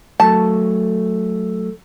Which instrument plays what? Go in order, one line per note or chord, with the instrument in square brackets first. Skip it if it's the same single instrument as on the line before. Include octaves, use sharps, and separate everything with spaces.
[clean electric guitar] F#3 A3 [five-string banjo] A5